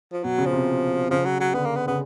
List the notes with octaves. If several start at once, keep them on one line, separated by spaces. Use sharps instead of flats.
F3
B2 F#3
C#3
F3
C3
C#3 F3
F#3
F#3
D3 B3
A#3
B3
C#3 B3